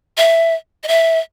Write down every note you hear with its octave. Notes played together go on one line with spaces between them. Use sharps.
E5
D#5
E5